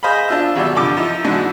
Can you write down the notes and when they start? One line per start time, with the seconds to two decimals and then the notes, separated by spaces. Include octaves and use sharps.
0.03 G#4 C5 D#5 F5 B5
0.28 D4 F4 E5
0.56 G#1 B2 F#3 G3 D5 E5
0.75 G2 D3 F3 D6
0.97 F3 D#4 E4
1.24 G#2 E3 G#3 D4 E4 F#4